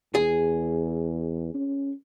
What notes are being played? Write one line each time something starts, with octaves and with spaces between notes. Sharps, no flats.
E2 G#4
C#4